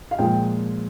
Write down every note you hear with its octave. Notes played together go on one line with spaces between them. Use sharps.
F5
A#2 F3 G#3 G5